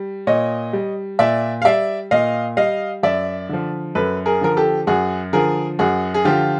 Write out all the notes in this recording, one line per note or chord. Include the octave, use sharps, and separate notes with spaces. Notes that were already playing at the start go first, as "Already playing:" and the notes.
Already playing: G3
A#2 C#5 D#5
G3
A#2 D5 E5
F5
G3 D5 E5
A#2 D#5 F5
G3 D#5 F5
F#2 D5 E5
D3 F3
F#2 A4 B4
G#4 A#4
D3 F3 A#4
G4 A4
F#2 F#4 G#4
D3 F3 G#4 A#4
F#2 F#4 G#4
G#4
D3 F3 F4 G4